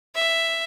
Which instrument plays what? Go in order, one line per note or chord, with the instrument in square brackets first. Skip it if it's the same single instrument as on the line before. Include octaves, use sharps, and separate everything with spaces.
[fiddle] E5